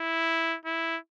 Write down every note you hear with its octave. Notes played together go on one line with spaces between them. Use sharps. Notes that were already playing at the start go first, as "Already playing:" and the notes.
Already playing: E4
E4